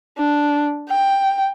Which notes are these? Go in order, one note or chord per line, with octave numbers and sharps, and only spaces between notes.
D4
G5